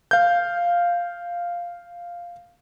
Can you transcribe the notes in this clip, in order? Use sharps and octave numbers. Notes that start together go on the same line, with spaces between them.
F5 G6